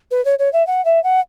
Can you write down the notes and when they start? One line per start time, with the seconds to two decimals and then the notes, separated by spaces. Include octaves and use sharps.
0.11 B4
0.25 C#5
0.39 C#5
0.53 E5
0.67 F#5
0.85 E5
1.04 F#5